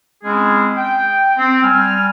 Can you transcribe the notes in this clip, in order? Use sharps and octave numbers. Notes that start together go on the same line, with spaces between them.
G#3 C4 C#4 E4 G#4
G5
C4
G3 G#5 F6